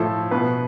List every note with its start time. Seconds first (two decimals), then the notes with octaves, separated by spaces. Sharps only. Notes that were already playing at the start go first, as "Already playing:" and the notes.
Already playing: A2 F3 A4
0.31 B2 B4